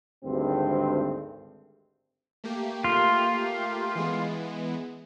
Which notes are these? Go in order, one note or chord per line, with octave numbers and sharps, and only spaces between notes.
G#1 D2 G2 C4
A3 A#3 G4
F4
E3 G#3 B3